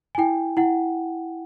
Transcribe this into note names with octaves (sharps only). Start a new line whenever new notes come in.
G#5
E4 G5
E4 F#5